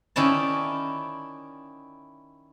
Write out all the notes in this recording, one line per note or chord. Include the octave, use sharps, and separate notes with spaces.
D#3 C#4 E4 D5 A5